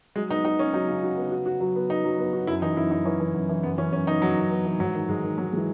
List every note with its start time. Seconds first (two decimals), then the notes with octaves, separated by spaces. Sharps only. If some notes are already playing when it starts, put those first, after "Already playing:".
0.16 F#3 G#3
0.30 B3 D#4
0.45 D#4 F#4
0.59 B3 C#4
0.74 F#3 D#4
0.88 C#3
1.03 F#4
1.17 B3
1.31 F#4
1.46 F#4
1.60 F#3
1.76 B3
1.90 B3 D#4
2.04 F#3
2.18 B3
2.33 F#4
2.47 F#2 E4
2.62 E3 D#4
2.77 F#2 E4
2.91 F#2 D#4
3.05 E3 C#4
3.20 E3
3.35 F#2
3.49 E3
3.63 F#2 B3
3.78 E3 C#4
3.93 F#2 C#4
4.07 B3 D#4
4.22 F#2 F#3
4.36 F#2
4.51 B3
4.65 E3
4.79 G#2 F#3
4.94 D#3
5.08 G#2 G#3
5.23 D#3
5.38 F#3 G#3
5.53 E3 G#3